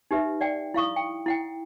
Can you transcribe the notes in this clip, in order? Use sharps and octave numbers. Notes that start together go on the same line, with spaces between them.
D#4 G4 B4 E5
D5 F#5 G5
E4 F5 C#6 D#6
G5
E4 F#5 G5